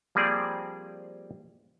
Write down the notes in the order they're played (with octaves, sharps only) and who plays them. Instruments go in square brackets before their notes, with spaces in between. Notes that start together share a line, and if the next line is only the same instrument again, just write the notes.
[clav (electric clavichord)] F3 G3 A#3 C4 G#4 D5